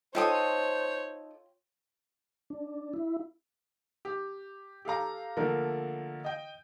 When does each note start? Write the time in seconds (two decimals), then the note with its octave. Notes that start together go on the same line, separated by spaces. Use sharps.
0.15 D#4 F4 A4 C5 C#5 G5 D#6
2.50 D4
2.94 E4
4.05 G4
4.85 G4 A4 F5 A#5
5.37 D3 F3 A3 A#3 A#4
6.24 D#5 G5